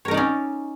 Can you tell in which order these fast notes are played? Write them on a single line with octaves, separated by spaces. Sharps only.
C#5 A#4 D#4 D5 C#4